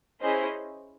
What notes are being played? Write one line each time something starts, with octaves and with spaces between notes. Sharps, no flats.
C#4 E4 G#4 C5 D#5